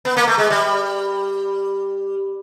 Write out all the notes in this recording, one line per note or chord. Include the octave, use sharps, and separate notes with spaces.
B3
A#3
A3
G#3
G3